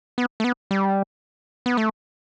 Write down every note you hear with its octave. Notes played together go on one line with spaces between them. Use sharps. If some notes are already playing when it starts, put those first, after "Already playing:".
B3
A3
B3
G3
B3
A3